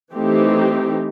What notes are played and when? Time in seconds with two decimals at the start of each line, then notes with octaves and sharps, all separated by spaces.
0.12 E3 A3 C4 D#4 G4